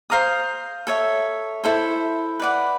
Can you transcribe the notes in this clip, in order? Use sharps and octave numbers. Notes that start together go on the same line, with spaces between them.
C5 F5 A#5 D#6
A4 C#5 E5
E4 A4 C5
B4 D5 F#5